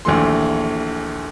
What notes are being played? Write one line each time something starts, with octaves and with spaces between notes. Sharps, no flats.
A#1 D#2 E3 A3 C6